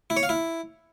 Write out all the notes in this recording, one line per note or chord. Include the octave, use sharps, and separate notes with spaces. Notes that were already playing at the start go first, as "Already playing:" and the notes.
E4
C#5
F5
E4